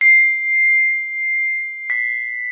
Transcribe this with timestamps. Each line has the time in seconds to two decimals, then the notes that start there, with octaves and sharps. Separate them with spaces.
0.01 C7
1.90 B6